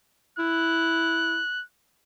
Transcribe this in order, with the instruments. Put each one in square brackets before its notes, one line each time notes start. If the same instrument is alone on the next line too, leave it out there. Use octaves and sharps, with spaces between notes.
[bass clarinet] E4 [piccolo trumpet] F#6